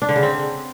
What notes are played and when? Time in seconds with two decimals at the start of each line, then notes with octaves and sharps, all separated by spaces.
0.02 D4
0.09 D3
0.16 C#3
0.23 C4